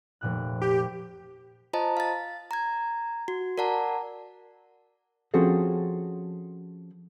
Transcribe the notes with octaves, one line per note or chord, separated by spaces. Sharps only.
F1 A#2 F#6
G4 G5
F4 C5 D#5 A5 A#5
F5 A6
A#5 G#6
F#4
A#4 D5 F#5 A5 A#5
F3 C4 C#4 F#4 G#4 A4